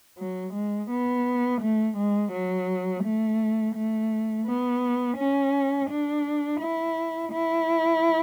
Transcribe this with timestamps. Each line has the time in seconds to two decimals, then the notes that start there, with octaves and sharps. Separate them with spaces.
0.18 F#3
0.54 G#3
0.91 B3
1.62 A3
1.98 G#3
2.33 F#3
3.04 A3
3.75 A3
4.46 B3
5.18 C#4
5.90 D4
6.61 E4
7.33 E4